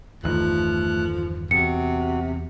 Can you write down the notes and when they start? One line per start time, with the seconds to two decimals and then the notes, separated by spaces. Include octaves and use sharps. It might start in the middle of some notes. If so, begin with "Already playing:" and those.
0.24 G1 E2 D#3 F3 A3 F#6
1.51 E2 C3 F#4 C#7